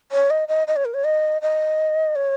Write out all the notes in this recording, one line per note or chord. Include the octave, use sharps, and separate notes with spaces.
C#5
D#5
D#5
D#5
C#5
A#4
C#5
D#5
D#5
C#5